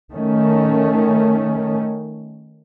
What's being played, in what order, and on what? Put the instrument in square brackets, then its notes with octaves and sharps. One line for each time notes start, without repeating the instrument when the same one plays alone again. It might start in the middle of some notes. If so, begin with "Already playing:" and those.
[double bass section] D#3 A3 C#4